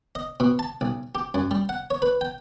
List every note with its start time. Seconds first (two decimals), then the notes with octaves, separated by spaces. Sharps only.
0.15 D#5
0.40 B2
0.59 A5
0.81 B1
1.15 G4
1.34 F#2
1.51 G3
1.69 F#5
1.90 C#5
2.02 B4
2.21 G5